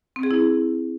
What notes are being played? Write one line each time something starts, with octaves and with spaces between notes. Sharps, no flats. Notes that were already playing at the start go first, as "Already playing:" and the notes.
C4
G#4
E4